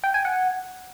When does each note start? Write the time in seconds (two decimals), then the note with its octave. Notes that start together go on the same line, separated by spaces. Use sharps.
0.04 G5
0.14 G#5
0.25 F#5